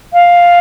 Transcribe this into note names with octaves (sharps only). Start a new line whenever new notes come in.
F5